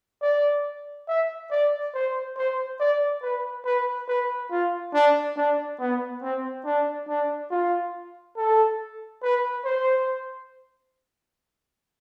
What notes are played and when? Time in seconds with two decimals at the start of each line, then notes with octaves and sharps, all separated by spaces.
0.22 D5
1.08 E5
1.51 D5
1.94 C5
2.37 C5
2.80 D5
3.22 B4
3.65 B4
4.08 B4
4.51 F4
4.94 D4
5.37 D4
5.80 B3
6.22 C4
6.65 D4
7.08 D4
7.51 F4
8.37 A4
9.23 B4
9.65 C5